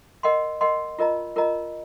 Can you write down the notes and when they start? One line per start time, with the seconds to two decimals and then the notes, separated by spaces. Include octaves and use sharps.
0.23 A#4 D#5 F#5 C6
0.61 A#4 D#5 F#5 C6
0.99 F4 A#4 D#5 A#5
1.36 F4 A#4 D#5 A#5